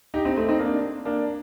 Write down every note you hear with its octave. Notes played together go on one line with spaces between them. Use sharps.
D#4 G4
C4 D#4
A3 C4
C4 D#4
A#3 D4
A#3 D4